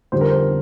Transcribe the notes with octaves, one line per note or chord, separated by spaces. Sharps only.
F1 F2 D3 G3 C5
A#4
C5